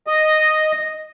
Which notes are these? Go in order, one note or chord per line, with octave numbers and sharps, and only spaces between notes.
D#5